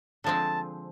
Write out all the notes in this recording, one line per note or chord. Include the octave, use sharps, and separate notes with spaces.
D3 F3 G#3 C4 A5